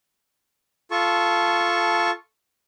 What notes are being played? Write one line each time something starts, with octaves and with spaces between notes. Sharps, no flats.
F4 A4 A5 C#6